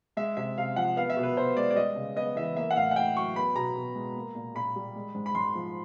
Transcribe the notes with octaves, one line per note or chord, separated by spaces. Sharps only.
G#3 E5
C3 E5
C3 F5
F3 F#5
B3 F5
E5
B2
B4
B2 C5
G#3 D5
D5
G3 D#5
C#3
B3 D#5
E3 E5
A#3 E5
F#5
A2 F5
F#5
A2 G5
F#3 C#6
B3 B5
B2 A#5
B2
G#3
A#3
A#2
A#2 B5
G3
G#3
G#2
B5
G#2 C6
F3